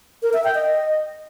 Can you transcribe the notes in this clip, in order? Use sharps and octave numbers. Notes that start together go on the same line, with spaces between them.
A#4
E5
G5
D#5